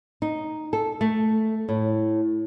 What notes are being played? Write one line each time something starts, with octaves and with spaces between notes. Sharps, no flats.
D#4
A4
A3
A2